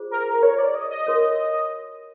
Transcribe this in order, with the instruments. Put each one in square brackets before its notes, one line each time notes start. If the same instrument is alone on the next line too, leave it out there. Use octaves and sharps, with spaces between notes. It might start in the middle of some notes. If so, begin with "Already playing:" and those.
Already playing: [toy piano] F4 G#4 C5
[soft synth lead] A#4
C#5
D5
D#5
D#5
[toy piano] F#4 A#4 C#5